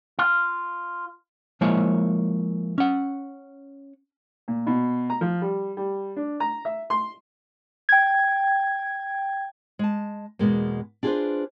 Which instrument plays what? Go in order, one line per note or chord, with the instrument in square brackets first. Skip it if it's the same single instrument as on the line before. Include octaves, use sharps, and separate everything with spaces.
[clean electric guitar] F4
[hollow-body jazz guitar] F3 G#3 A#3 E4 C5 C#5
C#4 F#5
[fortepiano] A#2
B2
A#5
F3
G3
G3
D4
A#5
E5
C6
[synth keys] G5 G#6
[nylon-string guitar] G#3 A5
E2 B2 G#3 A#3
D4 F4 G#4 A4 B4 C5